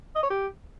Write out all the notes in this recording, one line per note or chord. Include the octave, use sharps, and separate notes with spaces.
D#5
C#5
G4